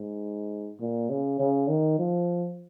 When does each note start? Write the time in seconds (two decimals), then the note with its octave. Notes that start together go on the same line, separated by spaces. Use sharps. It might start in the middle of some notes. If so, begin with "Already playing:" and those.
Already playing: G#2
0.80 A#2
1.10 C#3
1.39 C#3
1.68 D#3
1.98 F3